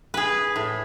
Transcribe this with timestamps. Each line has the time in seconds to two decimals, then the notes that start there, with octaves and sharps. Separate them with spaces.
0.14 G#4 B4
0.56 A2